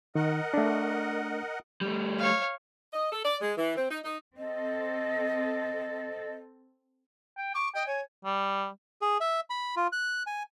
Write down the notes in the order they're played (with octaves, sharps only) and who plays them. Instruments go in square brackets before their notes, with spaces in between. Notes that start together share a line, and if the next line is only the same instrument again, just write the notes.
[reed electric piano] D#3 [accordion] A#4 D#5 F#5
[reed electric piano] A3 D4
[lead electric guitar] G3 A3
[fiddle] C#5 F5
[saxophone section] D#5
A4
D5
G#3
E3
C4
D#4
D#4
[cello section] C4 A4 [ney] D#5
[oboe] G5
[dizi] C#6 [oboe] D6
[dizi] D#5 [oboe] G5
[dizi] C#5 [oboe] G#5
[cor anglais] G3
[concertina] G#4
E5
B5
F4
F#6
G#5